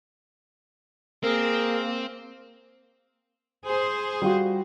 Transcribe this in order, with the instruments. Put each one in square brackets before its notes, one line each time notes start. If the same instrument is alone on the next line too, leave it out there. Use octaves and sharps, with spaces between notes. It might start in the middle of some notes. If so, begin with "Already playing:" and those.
[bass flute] A#3 [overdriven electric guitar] C4 [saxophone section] G#4 A#4
[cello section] G#4 C5
[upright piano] G3 F4 F#4